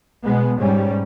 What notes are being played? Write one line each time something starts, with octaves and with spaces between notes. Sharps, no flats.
B1 B2 G#3 B3
G#2 G3 C#4